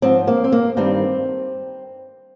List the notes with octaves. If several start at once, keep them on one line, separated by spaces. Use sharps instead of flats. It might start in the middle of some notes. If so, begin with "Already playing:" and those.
G#2 F3 C4
A#3
C4
A#3
G2 D#3 G3 C4